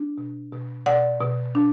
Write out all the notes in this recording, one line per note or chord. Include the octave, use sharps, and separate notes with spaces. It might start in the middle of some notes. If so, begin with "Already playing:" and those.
Already playing: D4
B2
B2
B2 D5 F#5
B2
D4